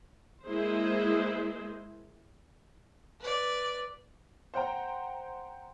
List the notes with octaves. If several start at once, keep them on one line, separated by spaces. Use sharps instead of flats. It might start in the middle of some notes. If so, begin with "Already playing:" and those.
G#3 A#3 E4 G#4 C5
B4 D5
C5 F#5 G5 A#5